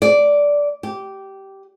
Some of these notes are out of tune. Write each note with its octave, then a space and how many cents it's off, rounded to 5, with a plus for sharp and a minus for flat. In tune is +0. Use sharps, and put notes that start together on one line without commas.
D5 -10
G4 -15